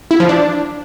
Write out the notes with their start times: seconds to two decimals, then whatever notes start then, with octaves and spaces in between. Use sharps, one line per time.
0.11 E4
0.20 F3
0.29 D4